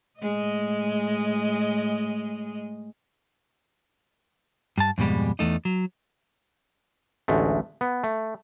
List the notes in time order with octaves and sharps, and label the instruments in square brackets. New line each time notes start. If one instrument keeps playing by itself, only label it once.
[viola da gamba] A2 G#3 D#5
[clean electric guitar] G2 A5
F2 G#2 B2 G3 G#3
E2 G#2 A3 D#4
F#3
[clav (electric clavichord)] A1 D2 G#3 A3
B3
A3